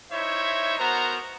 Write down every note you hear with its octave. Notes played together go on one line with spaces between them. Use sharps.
D#4 E4 C5 C#5 E5
B3 F#4 A#4 C5 A#5